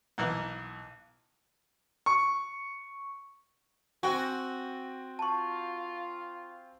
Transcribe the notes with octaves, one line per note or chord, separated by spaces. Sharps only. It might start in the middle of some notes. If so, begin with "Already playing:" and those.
B1 E3 A#3 B3
C#6
C4 F#4 G5 G#5
F4 A5 C#6